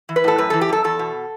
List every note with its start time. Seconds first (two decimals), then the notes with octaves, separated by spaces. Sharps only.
0.09 E3
0.16 B4
0.24 A2 A4
0.38 F#2 B4
0.50 E3 A4
0.61 G4
0.69 F#2 A4
0.84 E2 A4
0.99 B2